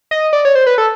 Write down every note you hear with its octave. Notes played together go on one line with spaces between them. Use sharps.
D#5
D5
C#5
C5
B4
A4